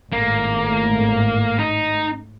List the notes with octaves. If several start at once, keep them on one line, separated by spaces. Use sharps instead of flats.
G#1 A2 A3 A#3
D#4